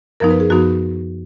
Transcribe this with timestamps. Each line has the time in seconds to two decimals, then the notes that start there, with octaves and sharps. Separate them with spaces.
0.20 F#2 F3 B3 D#4 A#4
0.30 B4
0.40 G#4
0.50 F#2 F3 B3 D#4 F#4